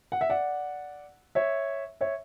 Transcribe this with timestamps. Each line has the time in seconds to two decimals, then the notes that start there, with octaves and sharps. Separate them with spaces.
0.12 F#5
0.21 E5
0.29 D5 F#5
1.35 C#5 E5
2.01 C#5 E5